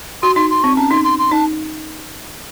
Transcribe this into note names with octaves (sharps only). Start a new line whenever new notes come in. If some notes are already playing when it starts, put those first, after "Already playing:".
F#4 C6
D#4 C6
C6
C4 C#6
C#4 A5
D#4 C6
C6
C6
D#4 A5